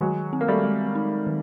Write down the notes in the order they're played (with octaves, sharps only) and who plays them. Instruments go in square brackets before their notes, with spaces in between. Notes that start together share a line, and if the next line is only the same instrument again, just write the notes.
[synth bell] D#3 [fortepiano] F#3 G#3
[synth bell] C4
[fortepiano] A#3
G3 A3
[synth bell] G#3
D#4
D#3